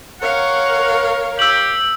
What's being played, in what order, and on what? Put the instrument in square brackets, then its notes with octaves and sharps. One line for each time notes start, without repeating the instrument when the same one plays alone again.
[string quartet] A#4 C#5 F5 [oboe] F#5
[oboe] G4 [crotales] E6 F#7